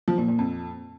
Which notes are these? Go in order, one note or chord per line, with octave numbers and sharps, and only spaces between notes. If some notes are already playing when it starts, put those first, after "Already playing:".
F3
A#2
A#2
F2